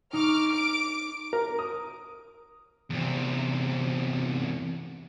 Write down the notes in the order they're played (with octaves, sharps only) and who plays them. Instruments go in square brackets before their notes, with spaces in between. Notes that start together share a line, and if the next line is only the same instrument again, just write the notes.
[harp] D#4 C#6 [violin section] D6 F6
[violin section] D6 D7
[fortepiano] A#4
D#6
[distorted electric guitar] E2 C3